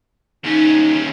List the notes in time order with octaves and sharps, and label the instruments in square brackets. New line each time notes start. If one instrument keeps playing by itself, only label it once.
[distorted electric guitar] D#2 C#4 [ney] D#4